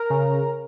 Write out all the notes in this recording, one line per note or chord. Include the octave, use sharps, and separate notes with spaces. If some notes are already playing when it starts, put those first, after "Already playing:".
Already playing: A#4
C#3